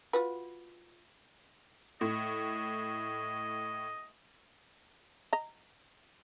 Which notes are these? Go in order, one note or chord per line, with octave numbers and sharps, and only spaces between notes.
F4 F#4 B4
A2 D#5
D#5 A#5